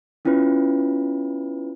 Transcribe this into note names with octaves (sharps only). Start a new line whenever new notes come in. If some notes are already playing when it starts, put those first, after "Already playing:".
B3 C#4 E4 F4 B4